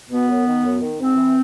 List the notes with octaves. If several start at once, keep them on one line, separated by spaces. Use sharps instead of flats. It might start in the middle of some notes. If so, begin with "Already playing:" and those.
B2 B3
F#2
D#3
F#2
D#3
G#2 C4
E3